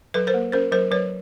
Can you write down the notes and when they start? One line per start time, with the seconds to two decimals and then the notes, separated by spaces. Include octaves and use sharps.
0.14 F#3 A4 B4
0.27 A#4 C5
0.34 A#3
0.52 C#4 A#4 C5
0.72 F#3 A#4 C5
0.91 F#3 B4 C#5